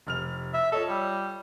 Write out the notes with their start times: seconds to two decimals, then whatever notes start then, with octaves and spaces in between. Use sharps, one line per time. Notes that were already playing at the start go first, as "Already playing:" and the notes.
0.07 F1 F6 F7
0.54 E5
0.72 F4 A4 C#5 D#5
0.89 G3